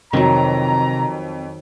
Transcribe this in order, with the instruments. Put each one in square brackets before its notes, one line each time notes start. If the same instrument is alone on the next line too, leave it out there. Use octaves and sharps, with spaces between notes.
[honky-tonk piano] F2 [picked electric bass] C3 C4 [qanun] D#3 F#3 [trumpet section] A#5